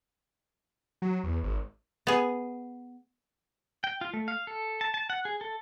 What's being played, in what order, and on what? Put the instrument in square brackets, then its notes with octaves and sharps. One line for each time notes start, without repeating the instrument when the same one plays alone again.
[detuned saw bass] F#3
E2
G#1
[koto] B3 G#4
[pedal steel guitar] G5
F4
A3
F5
A4
A5
A5
F#5
G#4
A4